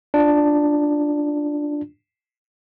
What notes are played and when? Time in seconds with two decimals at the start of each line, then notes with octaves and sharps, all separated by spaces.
0.14 D4 F4